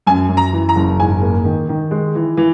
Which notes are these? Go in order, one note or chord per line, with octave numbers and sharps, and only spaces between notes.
F#2 G#5
F#2
A#5
E3
A#5
F#1
G#2 G#5
A#3
D#3
D#3
G#3
E3
E3